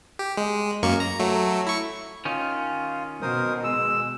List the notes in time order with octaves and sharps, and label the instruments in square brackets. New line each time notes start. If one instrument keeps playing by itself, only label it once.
[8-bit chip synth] G4
G#3
F#2 A#3 C#6
A#5
F#3 A3
E4 C#6
[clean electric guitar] D#3 C#4 [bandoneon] F4
[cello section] B2 [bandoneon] A#4 C5 D#6
[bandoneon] G#3 [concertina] E6